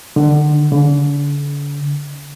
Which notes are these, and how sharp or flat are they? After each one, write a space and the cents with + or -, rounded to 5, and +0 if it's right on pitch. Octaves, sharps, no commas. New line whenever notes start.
D3 +25
D3 -40